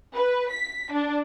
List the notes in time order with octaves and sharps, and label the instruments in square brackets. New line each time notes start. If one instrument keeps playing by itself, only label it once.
[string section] B4
B6
D4